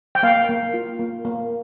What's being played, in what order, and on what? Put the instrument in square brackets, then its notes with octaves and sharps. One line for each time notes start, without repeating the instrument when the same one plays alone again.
[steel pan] G5
A#3 F5
A#3
F4
A#3
A#3